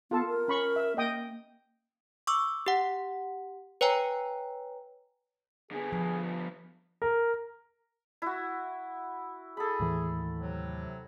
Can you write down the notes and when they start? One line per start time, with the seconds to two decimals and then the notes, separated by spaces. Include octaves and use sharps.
0.11 B3 F4 A4 A5
0.27 A#4
0.48 C#4 B5 C#6
0.76 E5
0.97 A#3 D#5 G5 D#6
2.27 C#6 D6 E6
2.66 G4 F#5
3.81 B4 C#5 G5 G#5 A#5
5.71 D3 B3 G#4
5.92 F3
7.02 A#4
8.22 E4 F#4
9.57 G#4 A4 B5
9.80 D#2 A2 E3
10.38 C3 F#3